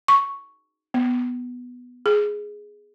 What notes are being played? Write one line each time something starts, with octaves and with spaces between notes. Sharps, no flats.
C#6
B3
G#4